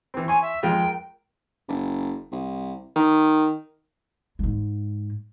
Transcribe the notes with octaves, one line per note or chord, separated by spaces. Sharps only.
E3 C4
G#5 C6 C#6
E5
F2 G#3 F4 G5
A#4
F#1
C2
D#3
G#2 G#3